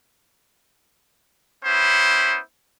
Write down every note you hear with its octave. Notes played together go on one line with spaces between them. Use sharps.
B3 C#4 E4 C5